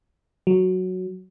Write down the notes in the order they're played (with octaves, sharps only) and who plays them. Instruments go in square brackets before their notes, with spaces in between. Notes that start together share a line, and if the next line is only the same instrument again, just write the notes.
[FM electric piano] F#3